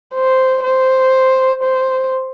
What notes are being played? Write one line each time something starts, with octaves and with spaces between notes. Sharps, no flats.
C5
C5
C5